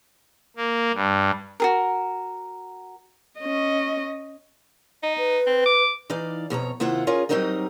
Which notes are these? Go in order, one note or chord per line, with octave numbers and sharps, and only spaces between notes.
A#3
G2
F#4 G#4 A#4
C#4 D#5
D#4 D#5
B4
C4
D6
E3 D#4 D5 F5
F2 B2 C#5 A#5
D#2 C3 E4 F4 C5 F#5
C#4 F4 G#4 A#4
F#3 G3 C4 D#4 A#4 D#5